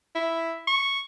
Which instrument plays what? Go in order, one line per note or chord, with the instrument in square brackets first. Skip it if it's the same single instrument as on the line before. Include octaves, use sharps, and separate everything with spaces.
[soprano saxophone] E4
C#6